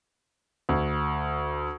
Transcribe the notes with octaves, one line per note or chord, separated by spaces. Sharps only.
D2